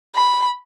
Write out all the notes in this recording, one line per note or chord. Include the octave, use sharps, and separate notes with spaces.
B5